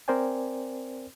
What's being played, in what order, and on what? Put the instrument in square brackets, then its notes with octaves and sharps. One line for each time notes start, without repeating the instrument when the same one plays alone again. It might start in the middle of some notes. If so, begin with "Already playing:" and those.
[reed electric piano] C4 A#4 C5 D5 G5 G#5